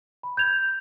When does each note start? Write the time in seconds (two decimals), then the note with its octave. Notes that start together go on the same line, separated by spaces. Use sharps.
0.23 B5
0.37 G6 G#6 F7